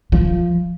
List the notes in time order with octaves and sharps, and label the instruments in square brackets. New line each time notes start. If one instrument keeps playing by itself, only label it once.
[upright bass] F3